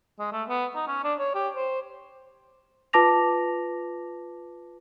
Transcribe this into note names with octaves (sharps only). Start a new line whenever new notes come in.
G#3
A3
B3
D#4
C#4
D4
C#5
G4
C5
F4 B4 A5 D6 A#6 F7